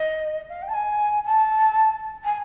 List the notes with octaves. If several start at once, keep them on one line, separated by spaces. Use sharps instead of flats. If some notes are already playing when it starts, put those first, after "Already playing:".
Already playing: D#5
F5
G5
A5
G#5
A5
G#5